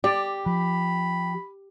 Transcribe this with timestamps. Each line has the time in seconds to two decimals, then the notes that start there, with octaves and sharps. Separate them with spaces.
0.04 G4 D5
0.46 F3 B5